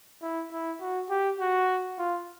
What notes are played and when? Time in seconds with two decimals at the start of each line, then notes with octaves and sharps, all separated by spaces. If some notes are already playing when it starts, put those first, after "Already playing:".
0.22 E4
0.52 E4
0.81 F#4
1.10 G4
1.40 F#4
1.98 F4